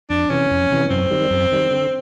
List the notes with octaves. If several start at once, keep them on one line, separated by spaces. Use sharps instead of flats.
F2 D4
C3 E3 C#4
F2
C3 E3
F#2 C4
D#3 G3
F#2
D#3 G3
D3